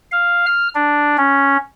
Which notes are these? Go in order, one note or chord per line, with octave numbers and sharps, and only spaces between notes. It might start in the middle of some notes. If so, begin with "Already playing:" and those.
F5
F6
D4
C#4